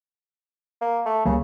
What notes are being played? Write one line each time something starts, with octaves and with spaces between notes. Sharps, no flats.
A#3
A3
C#2 C#3 G3 A#3